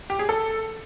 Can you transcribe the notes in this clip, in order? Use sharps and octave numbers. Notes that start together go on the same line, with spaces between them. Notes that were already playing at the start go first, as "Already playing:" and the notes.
G4
G#4
A4